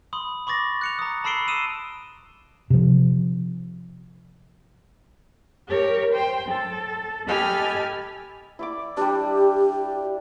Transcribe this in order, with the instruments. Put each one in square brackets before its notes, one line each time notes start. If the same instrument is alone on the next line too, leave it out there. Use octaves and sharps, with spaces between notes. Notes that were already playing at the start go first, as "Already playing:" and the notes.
[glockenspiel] B5 C6 D#6
B5 C#6 D6 A6 A#6
F#6 C#7 F7
A#5 D#6
A5 B5 E6 C7 D7 G7
D#6 E6 D#7 E7
[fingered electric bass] C3 F3
[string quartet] G4 A#4 C#5
C5 G5 C6
A4
G4 A4 D#5 G#5 B5 F6
[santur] E4 D5 D6
[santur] G3 D4 [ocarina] G4